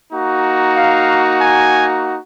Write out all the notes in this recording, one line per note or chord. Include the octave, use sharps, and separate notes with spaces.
A#3 D#4 F#4
F5
G#5